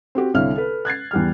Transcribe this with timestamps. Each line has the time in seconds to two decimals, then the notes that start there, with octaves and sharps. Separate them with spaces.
0.15 C4 F#4 G4
0.34 C2 D3 E4 C#5 F5 F6
0.56 A4 B4
0.85 F#6 G#6 A6 C7
1.11 E2 G3 F6